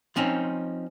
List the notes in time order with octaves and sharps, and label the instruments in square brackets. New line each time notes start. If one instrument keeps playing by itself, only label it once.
[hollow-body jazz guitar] F3 C4 C#4 D#4